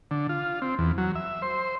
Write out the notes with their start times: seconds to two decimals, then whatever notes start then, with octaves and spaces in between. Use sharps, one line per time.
0.11 D3
0.29 F4
0.62 C4
0.79 E2
0.98 F#3
1.15 E5
1.42 C5